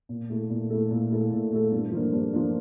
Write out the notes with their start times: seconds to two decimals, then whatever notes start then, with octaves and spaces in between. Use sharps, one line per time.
0.09 A#2
0.30 A3 E4 A4
0.50 A#2
0.70 A3 E4 A4
0.91 A#2
1.11 A3 E4 A4
1.32 A#2
1.52 A3 E4 A4
1.72 G2
1.92 F3 A#3 D4
2.13 G2
2.33 F3 A#3 D4